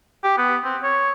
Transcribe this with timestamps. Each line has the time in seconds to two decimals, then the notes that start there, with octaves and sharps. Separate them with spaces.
0.24 G4
0.37 B3
0.64 C4
0.83 C#5